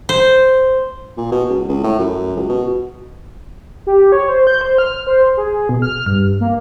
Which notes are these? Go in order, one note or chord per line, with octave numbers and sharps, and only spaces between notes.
C5
A#2
B2
C#2
C#2
A2
F#2
C#2
B2
G4
C#5
C5
G6
C5
F6
C5
G#4
B2
F6
G2
A#3